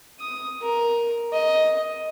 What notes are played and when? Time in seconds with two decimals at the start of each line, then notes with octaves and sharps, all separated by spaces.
0.20 D#6
0.62 A#4
1.33 D#5